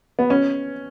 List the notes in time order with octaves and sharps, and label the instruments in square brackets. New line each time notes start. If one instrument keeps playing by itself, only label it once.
[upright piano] B3
C#4